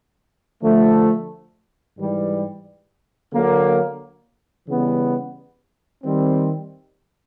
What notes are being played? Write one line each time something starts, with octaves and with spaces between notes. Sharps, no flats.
D3 F3 A3
G#2 E3 G3
D3 F#3 A#3
C#3 E3 G3 B3
D#3 G3 C4